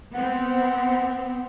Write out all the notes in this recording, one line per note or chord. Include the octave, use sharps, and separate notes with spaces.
B3 C4 F#5